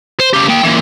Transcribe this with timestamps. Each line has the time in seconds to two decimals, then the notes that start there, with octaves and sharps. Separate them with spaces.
0.20 C5
0.34 C#3 G4
0.49 A#3 G5
0.64 A#2 E3